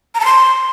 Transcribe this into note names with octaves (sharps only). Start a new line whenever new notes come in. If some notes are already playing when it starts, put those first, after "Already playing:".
A#5
A5
C6